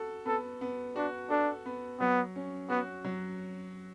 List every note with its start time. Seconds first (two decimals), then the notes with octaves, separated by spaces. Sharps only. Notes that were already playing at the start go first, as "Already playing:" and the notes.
Already playing: F#4 A4
0.25 B3 A4
0.61 B3
0.96 D4 F#4
1.30 D4 A4
1.66 B3
2.00 F#3 B3
2.36 C#4
2.70 B3 F#4
3.05 F#3